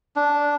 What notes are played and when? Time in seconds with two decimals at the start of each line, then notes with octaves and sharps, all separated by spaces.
0.16 D4